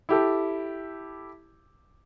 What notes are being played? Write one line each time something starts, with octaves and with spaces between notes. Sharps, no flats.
E4 G4 A4